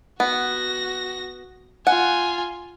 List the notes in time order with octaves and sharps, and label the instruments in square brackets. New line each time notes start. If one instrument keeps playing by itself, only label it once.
[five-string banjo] B3 [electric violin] F#4 A#6
[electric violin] F4 G#5 [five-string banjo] F#5